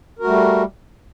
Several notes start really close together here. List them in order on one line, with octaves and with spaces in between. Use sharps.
A#4 F#4 A3 G3